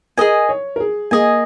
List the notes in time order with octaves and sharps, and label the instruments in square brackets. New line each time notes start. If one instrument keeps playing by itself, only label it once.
[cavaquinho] G#4 D#5 G#5 [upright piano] A#4
[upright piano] C#5
A#4
G#4
[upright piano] A#3 [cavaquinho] G#4 D#5 G#5